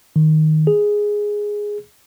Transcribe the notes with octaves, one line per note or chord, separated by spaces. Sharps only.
D#3
G#4